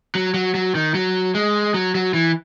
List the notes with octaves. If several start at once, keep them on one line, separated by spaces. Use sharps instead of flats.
F#3
F#3
F#3
D#3
F#3
G#3
F#3
F#3
E3